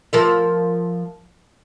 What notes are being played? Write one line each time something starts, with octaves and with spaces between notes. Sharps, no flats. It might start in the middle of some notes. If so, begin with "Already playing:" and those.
F3 A#4 E5